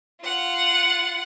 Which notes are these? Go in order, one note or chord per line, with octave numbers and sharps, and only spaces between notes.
F4 F#5